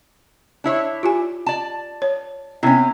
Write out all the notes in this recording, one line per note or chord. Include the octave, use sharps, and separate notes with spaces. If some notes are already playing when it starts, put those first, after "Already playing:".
D4 E4 C#5
F4 G4 G#5
D5 A5
C#5
C3 B3 C#4 E4